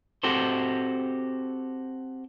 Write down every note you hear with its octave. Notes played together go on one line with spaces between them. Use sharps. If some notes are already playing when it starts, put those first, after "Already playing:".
C4 F#4 G4 A4 C5